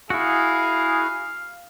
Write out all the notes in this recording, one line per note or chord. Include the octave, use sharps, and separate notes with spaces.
E4 F#4 G#4 F5